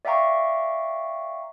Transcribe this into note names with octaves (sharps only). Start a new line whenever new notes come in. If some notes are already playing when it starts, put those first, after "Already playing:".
D5 E5 F5 G5 A#5 C#6